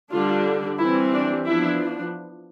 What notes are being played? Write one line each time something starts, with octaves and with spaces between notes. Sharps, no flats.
D3 G3 D4 F4
E3 G3 C4 E4
D4
F3 B3 D4 E4